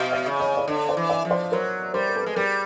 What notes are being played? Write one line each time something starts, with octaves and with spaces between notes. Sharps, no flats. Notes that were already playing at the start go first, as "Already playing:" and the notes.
Already playing: B2 D#5 F5
D5 E5
C#3
C#5 D#5
D5
D3 C#5 D#5
C5 D5
E3
D5 E5
F3
C5 D5
F#3 A#4 C5
G3 A#4 C5
A#4
A4 B4
G#3
G3 G#4 A#4